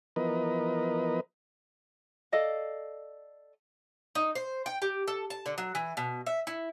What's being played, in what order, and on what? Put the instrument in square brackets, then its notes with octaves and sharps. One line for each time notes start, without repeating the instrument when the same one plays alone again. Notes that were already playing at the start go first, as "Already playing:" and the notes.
[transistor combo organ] E3 F3 B3 A#4 B4 D#5
[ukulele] A4 D5 D#5 F5
[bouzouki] D#4
C5
G5
G4
A4
A5
D3
F#3
E3
B2
E5
E4